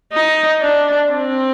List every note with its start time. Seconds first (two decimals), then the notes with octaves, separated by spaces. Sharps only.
0.13 D#4
0.61 D4
1.11 C4